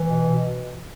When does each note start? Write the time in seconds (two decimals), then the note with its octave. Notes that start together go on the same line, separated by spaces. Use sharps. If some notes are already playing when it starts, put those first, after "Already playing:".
Already playing: E3
0.08 B2
0.28 B2